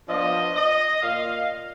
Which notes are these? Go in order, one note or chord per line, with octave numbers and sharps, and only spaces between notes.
F3 B3 D4 F4 D#5
D#5
A#2 F5